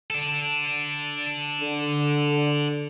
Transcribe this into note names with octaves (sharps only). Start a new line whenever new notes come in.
D4 A4
D3